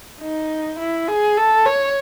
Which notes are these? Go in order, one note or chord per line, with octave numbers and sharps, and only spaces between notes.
D#4
E4
G#4
A4
C#5